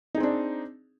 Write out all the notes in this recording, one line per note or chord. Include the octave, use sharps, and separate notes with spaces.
C4 D4 D#4 G#4